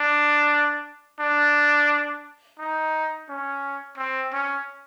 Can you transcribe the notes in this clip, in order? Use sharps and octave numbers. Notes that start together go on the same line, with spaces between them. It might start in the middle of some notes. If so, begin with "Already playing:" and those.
Already playing: D4
D4
D#4
C#4
C4
C#4